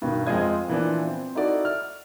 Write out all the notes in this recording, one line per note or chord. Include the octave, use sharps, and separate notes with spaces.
G2 B2 D#3
F2 G#3 C4 F4 D#5 G#6
A#2 E3 F3 B3 D4
C4
D#4 E4 F#4 A4 D5
F6